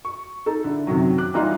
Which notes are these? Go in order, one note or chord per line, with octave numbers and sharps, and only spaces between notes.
C#6
D#4 A4
D3 E4
F#2 C3 D#3 F#3
D6 F#6
E3 G3 D#4 F4 D#5 C6